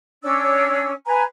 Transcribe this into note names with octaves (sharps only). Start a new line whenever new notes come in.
C#4 D4 C#5 E6
B4 G#5 A#5